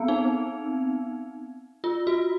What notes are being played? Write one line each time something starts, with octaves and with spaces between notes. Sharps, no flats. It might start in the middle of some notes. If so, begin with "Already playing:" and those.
Already playing: B3 C4
D#4
F4
F#4